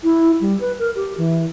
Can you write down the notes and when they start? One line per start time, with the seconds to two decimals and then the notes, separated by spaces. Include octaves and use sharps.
0.04 E4
0.41 G3
0.60 B4
0.79 A#4
0.96 G4
1.18 E3